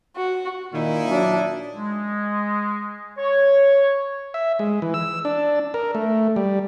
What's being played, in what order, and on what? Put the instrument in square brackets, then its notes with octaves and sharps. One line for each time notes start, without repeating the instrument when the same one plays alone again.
[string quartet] F#4
[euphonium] A#2 [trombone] D#3 [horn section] D#4 E4
[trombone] F#3 [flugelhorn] D4
[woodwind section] G#3
C#5
[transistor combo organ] E5
G#3
E3
E6
D4
A#4
A3
G3